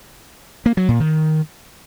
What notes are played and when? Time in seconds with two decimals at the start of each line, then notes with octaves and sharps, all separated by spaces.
0.66 A#3
0.77 F#3
0.89 A#2
1.00 D#3